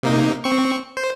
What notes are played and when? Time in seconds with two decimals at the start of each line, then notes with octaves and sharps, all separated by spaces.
0.03 C3 A#3 D#4
0.44 C4 C#6
0.97 C5